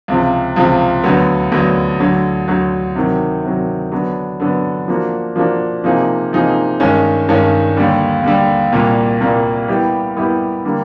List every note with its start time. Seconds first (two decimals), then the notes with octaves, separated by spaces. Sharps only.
0.08 C#2 C3 F3
0.56 C#2 C3 F3
1.03 D2 D3 F#3 B3
1.52 D2 D3 F#3 B3
2.00 D2 D3 F#3
2.48 D2 D3 F#3
2.95 C3 D#3 F#3
3.43 C3 D#3 F#3
3.92 D3 F#3 B3 D4
4.40 D3 F#3 B3 D4
4.88 F3 A#3 D4 F#4
5.36 F3 A#3 D4 F#4
5.84 C3 F3 A#3 D#4 G#4
6.31 C3 F3 A#3 D#4 G#4
6.80 G2 D#3 G#3 C#4
7.29 G2 D#3 G#3 C#4
7.77 D#2 D3 G3
8.24 D#2 D3 G3
8.72 C2 A#2 G3 A#3
9.20 C2 A#2 G3 A#3
9.68 G3 B3 E4 G4 A#4
10.16 G3 B3 E4 G4 A#4
10.65 D3 G3 A#3